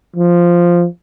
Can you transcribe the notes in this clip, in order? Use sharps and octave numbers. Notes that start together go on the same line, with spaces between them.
F3